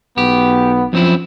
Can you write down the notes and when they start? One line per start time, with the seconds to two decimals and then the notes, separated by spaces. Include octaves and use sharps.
0.18 B1 B3 G4
0.93 F#2 F3 C4 E4